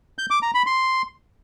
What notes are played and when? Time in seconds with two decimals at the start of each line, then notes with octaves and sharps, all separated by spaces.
0.18 G6
0.30 D6
0.42 A#5
0.54 B5
0.66 C6